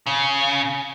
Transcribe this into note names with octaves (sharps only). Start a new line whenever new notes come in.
C#3